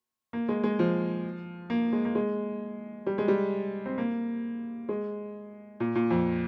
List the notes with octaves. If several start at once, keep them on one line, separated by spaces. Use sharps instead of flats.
A#3
G#3
G#3
F3
A#3
G#3
A#3
G#3
G3
G#3
G3
C4
A#3
G#3
A#2
A#2
F2